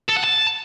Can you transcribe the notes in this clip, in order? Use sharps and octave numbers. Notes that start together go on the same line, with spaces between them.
A4
F#5
A5